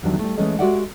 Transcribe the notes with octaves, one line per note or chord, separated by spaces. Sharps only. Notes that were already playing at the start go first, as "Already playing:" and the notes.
E2 D3 D#3 F#3 G3 D4
G3 A3
E3 G#3 A3 C#4 A4 D#5
G#3 F#4 G4 D5 E5 F#5